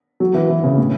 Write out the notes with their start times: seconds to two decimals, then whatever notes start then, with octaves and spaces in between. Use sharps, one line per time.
0.20 F#3
0.34 E3
0.50 E3
0.64 C#3
0.78 A2